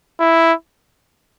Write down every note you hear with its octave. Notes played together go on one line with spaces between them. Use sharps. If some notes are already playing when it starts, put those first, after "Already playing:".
E4